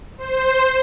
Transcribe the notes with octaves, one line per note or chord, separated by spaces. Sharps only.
C5